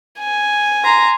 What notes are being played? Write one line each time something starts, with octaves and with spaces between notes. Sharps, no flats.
G#5
A#5 C6